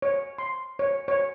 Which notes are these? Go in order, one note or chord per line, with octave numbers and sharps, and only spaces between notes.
C#5
C6
C#5
C#5